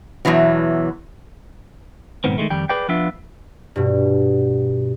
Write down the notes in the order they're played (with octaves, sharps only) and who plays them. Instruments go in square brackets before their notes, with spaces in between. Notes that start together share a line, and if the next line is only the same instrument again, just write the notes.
[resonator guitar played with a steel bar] E2 G#2 B2 E3 F#3
[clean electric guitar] B1 G#2 D#3 B3 C4
D#3 F#3 G#3 A3
F2 D#3 G3 G5
G#4 B4 D5 G5
F3 B3 D4 F4 E5
[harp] G2 B2